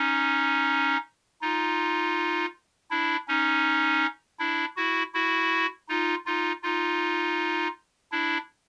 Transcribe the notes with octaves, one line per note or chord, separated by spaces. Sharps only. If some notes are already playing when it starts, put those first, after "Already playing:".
Already playing: C#4 D#4
D#4 F4
D4 E4
C#4 D#4
D4 E4
E4 F#4
E4 F#4
D#4 F4
D#4 F4
D#4 F4
D4 E4